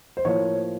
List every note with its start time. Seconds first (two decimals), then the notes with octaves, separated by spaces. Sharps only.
0.17 C5
0.25 A2 F3 A#3 C#5